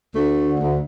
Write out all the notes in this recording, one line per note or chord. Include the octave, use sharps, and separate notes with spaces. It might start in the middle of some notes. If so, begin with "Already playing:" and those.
D2 A3
D3
D2